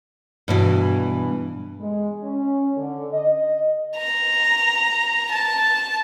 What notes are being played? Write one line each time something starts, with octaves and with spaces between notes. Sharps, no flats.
G2 B2 E3
G#3
C#4
D3
D#5
A#5
A5